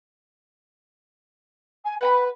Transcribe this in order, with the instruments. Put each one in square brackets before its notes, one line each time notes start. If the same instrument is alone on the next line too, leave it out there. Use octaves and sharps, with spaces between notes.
[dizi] G#5
[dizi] B4 [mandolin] F#5 G5 B5